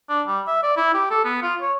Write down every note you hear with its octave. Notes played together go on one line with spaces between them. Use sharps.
D4
G3
E5
D5
E4
G4
A4
B3
F4
C#5